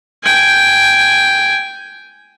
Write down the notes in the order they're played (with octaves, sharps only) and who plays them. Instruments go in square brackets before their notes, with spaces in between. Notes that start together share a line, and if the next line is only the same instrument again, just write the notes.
[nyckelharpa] G5 G#5